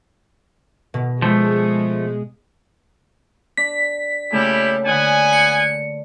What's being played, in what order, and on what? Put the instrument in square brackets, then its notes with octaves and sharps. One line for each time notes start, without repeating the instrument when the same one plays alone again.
[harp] B2
[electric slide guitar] F3 A3 [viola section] G#3
[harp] D4 [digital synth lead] B6
[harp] A#2 C#3 A3 [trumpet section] G3 E4 G4
[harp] D3 D4 [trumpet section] B3 F#5 G#5
[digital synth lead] C#7